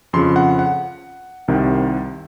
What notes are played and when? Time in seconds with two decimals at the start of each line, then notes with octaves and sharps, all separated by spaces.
0.13 F2 C#3 F3 C6
0.36 F#5
0.59 F#5
1.48 C2 C3 D#3